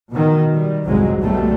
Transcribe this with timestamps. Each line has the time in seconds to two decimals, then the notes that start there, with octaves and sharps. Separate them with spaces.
0.12 B2 D#3
0.55 G3
0.86 C2 F2 G#2 F#3 G#3
1.21 B1 B2 D3 G3 A3